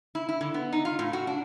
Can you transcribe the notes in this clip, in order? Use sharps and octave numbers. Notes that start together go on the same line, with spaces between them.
E4
E4
D3
B3
D#4
F4
A2
F#4
D4